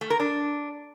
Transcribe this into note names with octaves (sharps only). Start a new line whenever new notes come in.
A3
A#4
D4